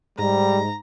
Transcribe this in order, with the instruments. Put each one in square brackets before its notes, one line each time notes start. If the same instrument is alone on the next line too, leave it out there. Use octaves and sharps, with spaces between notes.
[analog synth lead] G#2 [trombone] G3 [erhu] A#5